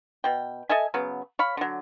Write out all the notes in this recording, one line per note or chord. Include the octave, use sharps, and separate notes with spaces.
B2 G5
A4 D#5 E5 G#5
C#3 F#3 B3
C#5 F5 B5
D3 F#3